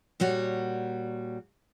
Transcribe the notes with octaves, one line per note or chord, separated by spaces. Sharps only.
A#2 G3 F#4 C#5